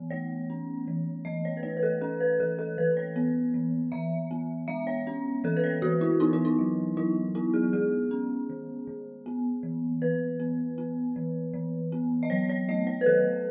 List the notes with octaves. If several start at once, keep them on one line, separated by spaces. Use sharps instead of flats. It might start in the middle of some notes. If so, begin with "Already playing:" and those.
Already playing: E3 B3
A3 C#5
C#4
E3
E3 D#5
C#5
B4
A3 C#5
B4
A4
C#4 A4
B4
E3 A4
A4
E3 B4
C#5
B3
E3
E3 E5
B3
G#3 E5
C#5
C#4
E3 A4
B4
C#5
E3 F#4
E4
B3 D#4
E4
D#4
F#3
F#3 E4
B3 E4
G#4
G#3 G#4
C#4
D#3
D#3
B3
E3
E3 B4
B3
B3
E3
E3
B3
D#5
F#3 C#5
C#5
A3 D#5
C#5
B4
D#3 A4